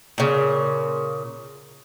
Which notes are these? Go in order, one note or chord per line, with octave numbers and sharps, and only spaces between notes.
A#2 C#3